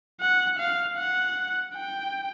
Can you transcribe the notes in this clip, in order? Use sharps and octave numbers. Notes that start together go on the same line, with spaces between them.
F#5
F5
F#5
G5